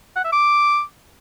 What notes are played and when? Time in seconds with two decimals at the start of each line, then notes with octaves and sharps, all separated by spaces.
0.16 F#5
0.24 E5
0.33 D6